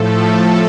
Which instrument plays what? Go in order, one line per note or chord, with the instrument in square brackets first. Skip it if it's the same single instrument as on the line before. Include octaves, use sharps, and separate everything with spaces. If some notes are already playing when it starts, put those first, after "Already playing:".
Already playing: [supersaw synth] A2 F3 A3 A4